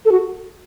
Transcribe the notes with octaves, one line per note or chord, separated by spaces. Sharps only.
A4
F#4